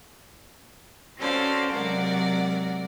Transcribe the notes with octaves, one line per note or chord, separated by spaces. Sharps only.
C#4 F#4 A4 C5 D5 F5
C3 F#3 G#3 A#4 D5 F#5